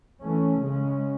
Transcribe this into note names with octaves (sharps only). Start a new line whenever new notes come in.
E3 A3 C#4
C#3 G#3 C#4